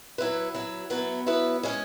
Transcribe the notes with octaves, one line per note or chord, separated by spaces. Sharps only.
F#3 E4 B4
F#3 E4 B4
F#3 B3 E4 B4
F#3 B3 E4 B4
G#3 C#4 G#4 C#5